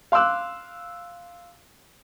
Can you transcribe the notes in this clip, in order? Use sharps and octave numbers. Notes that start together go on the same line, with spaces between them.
F5 C6 D6 E6 F#6